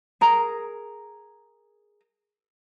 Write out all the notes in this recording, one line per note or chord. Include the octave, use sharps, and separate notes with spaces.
G#4 A#4 A#5